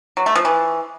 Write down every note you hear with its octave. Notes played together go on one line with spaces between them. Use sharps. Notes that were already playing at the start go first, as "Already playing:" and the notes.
F#3
A3
F3
E3